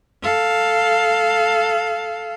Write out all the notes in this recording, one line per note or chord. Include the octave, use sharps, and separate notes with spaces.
A4 F5